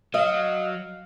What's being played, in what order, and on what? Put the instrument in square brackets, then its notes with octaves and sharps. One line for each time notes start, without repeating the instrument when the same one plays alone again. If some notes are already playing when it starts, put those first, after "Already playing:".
[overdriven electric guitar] F#3 [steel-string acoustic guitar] D#5 [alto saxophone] F5